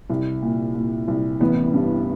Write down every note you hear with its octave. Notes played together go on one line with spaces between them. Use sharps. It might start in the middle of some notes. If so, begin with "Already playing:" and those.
C2
A#2
A#2
C2
A1 B3
G2